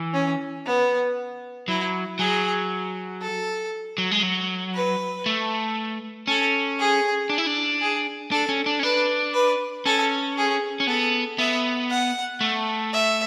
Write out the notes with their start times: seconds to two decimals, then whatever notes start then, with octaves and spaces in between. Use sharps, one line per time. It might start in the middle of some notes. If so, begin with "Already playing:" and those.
Already playing: E3
0.14 C#4
0.66 B3
1.68 F#3 E4
2.19 F#3 G#4
3.21 A4
3.98 F#3
4.11 G#3
4.23 F#3
4.74 B4
5.26 A3
6.27 C#4 A4
6.79 G#4
7.30 D4
7.38 E4
7.47 D4
7.81 G#4
8.31 D4 A4
8.49 C#4
8.66 D4
8.79 C#4
8.83 D4 B4
9.34 B4
9.86 C#4 A4
10.37 G#4
10.80 C#4
10.87 B3 A4
11.38 B3 E5
11.90 F#5
12.41 A3
12.93 E5